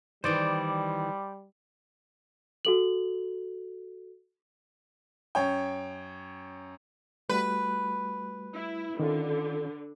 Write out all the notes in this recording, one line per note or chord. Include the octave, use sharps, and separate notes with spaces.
D#3 E3 G3 C5 D5
F#4 A4 F#7
F#2 C#5 G5
G3 A3 F#4 B4
E4
D3 D#3 C#4 F4